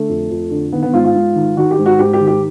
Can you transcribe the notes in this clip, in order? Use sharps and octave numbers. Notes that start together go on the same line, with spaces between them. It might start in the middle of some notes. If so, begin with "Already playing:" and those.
Already playing: D3 A3
F2
F2
D3
D#3 B3
B3
G#2 F4
F4
G#2
D#3
D#3 F#4
G4
G#2
F#4
G#2 G4
G4
D#3
G4